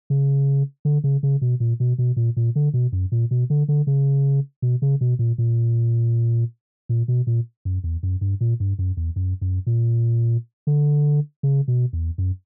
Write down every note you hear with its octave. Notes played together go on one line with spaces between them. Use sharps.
C#3
D3
C#3
C#3
B2
A#2
B2
B2
A#2
A#2
D3
B2
F#2
A#2
B2
D3
D3
C#3
B2
C#3
B2
A#2
A#2
A#2
B2
A#2
F#2
E2
F#2
G2
A#2
G2
F#2
E2
F#2
F#2
A#2
D3
C#3
B2
E2
F#2